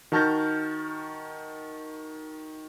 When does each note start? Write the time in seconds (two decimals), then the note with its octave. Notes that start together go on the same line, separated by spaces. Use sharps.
0.12 D#3 F#4 A5 F6 G6 A#6